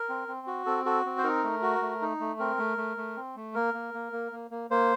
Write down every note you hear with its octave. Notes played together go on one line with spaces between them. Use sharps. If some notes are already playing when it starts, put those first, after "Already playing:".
Already playing: A#4
C4
C4
F#4
C4 A4
F#4 A4
C4
C5
D#4 A#4
A3
F#4
A3
D#4
A3
C4 A#4
A3
A3
A3
C4
A3
A#3 A#4
A#3
A#3
A#3
A#3
A#3
A#3 C5